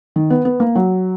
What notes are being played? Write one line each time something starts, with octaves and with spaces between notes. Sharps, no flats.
D#3
B3
B3
A#3
F#3